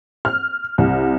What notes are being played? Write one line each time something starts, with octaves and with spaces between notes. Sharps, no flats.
F6
C2